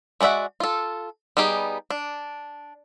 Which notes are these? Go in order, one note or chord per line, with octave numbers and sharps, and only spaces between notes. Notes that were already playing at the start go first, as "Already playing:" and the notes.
G#3 F#4 D5 E5 F#5
F4 A4
G3 B3 D#4 G4 G#4
D4